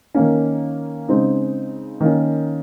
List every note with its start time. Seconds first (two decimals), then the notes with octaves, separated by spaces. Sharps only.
0.14 D#3 A#3 C#4
1.08 C#3 G#3 C4 D#4
2.01 D#3 A#3 C#4